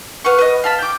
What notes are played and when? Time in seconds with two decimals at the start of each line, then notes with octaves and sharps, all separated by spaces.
0.24 B4 F5 F#5 C#6
0.39 B4 D#5
0.64 F5 A5 B5
0.79 G5 D6